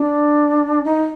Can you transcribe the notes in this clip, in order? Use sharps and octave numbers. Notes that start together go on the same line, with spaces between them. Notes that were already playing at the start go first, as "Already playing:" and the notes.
Already playing: D4
D#4